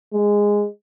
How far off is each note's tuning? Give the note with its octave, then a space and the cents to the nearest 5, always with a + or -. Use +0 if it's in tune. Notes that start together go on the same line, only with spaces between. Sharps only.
G#3 -10